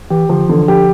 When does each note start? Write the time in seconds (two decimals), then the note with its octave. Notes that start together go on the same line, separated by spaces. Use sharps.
0.10 E3 G4
0.29 D3 F3
0.48 D3 E3
0.68 F3 G4